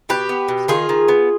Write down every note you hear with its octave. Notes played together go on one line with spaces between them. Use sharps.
B2 G4 B4
B3
B2
D#3 F4 G#4
D#3
B3